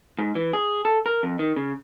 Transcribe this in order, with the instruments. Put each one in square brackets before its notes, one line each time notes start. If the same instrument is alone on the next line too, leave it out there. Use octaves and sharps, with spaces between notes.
[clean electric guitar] G#2
E3
G#4
A4
A#4
F2
D#3
C#3